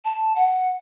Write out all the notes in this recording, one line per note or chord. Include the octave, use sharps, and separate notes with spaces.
A5
F#5